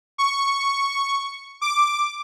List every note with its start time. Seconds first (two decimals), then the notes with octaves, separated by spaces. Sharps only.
0.18 C#6
1.61 D6